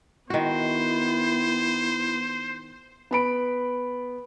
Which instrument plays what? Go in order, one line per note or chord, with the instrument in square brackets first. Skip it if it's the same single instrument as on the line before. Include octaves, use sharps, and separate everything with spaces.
[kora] D#3 F#4 [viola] B3 [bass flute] E4 [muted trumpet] C5
[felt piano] B3 B5 D7